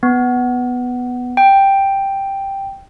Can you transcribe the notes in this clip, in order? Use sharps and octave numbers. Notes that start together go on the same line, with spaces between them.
B3
G5